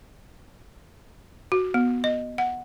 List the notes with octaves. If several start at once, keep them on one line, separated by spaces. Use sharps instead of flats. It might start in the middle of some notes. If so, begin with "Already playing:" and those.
F#4
B3
D#5
F#5